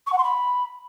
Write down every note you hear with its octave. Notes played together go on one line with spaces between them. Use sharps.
C#6
F#5
C6
B5